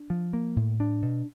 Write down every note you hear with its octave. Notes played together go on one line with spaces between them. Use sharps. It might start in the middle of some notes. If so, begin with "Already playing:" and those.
Already playing: D4
F3
A#3
A2
D4
B2